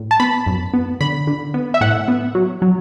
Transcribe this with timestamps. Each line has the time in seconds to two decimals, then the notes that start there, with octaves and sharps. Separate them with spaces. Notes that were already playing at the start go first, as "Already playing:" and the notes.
Already playing: A2
0.11 A5
0.20 B3 B5
0.46 F#2
0.74 B3
1.01 D3 B5
1.27 D3
1.54 B3
1.74 E5
1.81 A2 F#5
2.08 B3
2.35 F#3
2.62 F#3